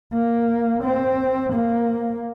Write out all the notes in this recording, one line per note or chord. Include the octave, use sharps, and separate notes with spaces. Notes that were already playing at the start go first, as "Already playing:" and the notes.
A#3
C4
A#3